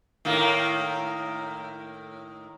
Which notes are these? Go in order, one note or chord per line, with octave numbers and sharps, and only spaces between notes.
A2 D#3 A#3